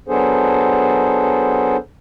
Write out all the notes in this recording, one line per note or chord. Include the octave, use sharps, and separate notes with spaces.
F#3 B3 D4 G#4 A4 C5